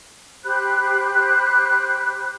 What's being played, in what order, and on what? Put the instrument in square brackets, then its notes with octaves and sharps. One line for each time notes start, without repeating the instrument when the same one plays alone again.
[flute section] G4 C5 B5 F#6